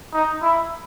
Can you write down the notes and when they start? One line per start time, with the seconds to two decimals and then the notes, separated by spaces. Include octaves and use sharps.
0.14 D#4
0.43 E4